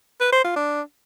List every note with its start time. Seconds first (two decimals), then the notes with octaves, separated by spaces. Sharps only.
0.21 B4
0.32 C5
0.44 F4
0.56 D4